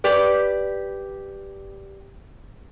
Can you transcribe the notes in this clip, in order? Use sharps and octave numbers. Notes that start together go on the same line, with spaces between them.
G4 B4 D5